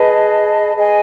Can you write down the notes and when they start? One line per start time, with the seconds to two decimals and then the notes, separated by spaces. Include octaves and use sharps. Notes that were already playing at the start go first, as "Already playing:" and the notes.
Already playing: G#4 B4 D#5 A5
0.76 G#4 D#5 G#5